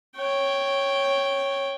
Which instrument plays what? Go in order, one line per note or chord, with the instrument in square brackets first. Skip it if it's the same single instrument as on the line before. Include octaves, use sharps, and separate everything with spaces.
[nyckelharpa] C#5 G5